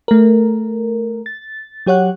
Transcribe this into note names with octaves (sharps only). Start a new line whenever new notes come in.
A3 A#4
A6
F#3 G4 C#5 F#5 F#6